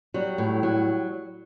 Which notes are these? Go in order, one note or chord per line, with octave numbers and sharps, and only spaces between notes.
F#3 G3
A2
F#3